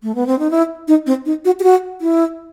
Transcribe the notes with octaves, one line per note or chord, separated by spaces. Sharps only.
A3
B3
C4
D#4
E4
D#4
C4
D#4
F#4
G4
F#4
E4